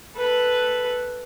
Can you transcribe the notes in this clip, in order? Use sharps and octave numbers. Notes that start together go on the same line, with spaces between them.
A4 B4